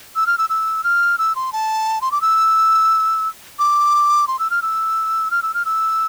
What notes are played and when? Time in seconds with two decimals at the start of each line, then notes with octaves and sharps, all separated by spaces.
0.16 E6
0.27 F6
0.38 E6
0.50 E6
0.84 F6
1.18 E6
1.36 C6
1.53 A5
2.02 C6
2.12 D6
2.21 E6
3.59 D6
4.28 C6
4.39 E6
4.51 F6
4.62 E6
5.31 F6
5.43 E6
5.54 F6
5.65 E6